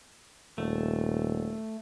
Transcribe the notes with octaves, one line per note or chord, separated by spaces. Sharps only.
D#1 A3